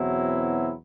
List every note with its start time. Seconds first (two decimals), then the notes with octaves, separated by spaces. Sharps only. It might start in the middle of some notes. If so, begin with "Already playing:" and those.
Already playing: E2 B2 F#3 C4 E4